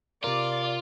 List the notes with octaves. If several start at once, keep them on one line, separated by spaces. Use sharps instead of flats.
C3 F4 A#4 D5